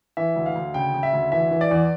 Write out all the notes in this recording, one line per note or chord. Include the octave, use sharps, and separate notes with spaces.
E3 E5
D2
F5
D2
C#3 G5
C#3
E5
D2
E3 E5
E3
D5
E2